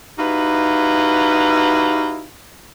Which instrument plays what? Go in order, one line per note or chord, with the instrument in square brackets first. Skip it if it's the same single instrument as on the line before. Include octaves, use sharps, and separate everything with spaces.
[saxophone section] D#4 E4 F#4 G4 B4 F5